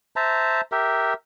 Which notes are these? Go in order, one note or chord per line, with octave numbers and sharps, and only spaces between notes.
C5 E5 A5 A#5
G4 A#4 E5